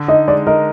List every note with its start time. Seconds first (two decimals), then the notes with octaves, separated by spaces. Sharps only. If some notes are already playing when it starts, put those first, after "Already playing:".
Already playing: D3
0.08 D#4 D#5
0.28 G#3 D5
0.47 A#4 D#5